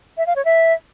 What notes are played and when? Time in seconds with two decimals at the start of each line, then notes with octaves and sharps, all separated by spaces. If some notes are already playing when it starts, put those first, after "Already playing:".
0.17 E5
0.27 F5
0.36 C#5
0.45 E5